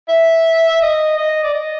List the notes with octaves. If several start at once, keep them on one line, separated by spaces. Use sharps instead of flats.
E5
D#5
D#5
D5
D#5